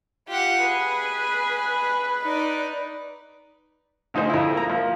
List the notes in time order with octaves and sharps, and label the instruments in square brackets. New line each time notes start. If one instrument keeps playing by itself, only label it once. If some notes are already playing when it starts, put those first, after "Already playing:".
[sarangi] F4 [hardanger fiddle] G4 F#5
[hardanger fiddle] G#4 [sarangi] B4
[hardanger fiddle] D#4 D5
[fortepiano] D2 F3 D#4 F4 G#4 C5
F2 E4
A#3 A#5
F3 A#3